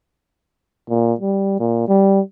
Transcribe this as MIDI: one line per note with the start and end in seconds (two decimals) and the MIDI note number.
0.90 1.13 46
1.20 1.56 55
1.60 1.86 46
1.88 2.20 55